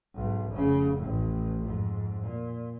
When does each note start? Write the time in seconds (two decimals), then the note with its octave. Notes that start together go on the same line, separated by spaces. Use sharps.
0.15 B1 G#2
0.52 F1 C#3
0.97 A1 A2
1.63 F2 G#2
2.23 A#2